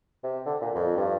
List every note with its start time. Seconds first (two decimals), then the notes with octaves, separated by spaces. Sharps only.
0.24 C3
0.46 D3
0.61 A#2
0.75 F2
0.97 G2